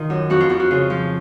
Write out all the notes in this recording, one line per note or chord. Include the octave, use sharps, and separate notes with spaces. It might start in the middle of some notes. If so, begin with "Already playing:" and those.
Already playing: D#3 F4
F#2
F2 F#4
F4
F2 F#4
F#4
C#3 F4
F3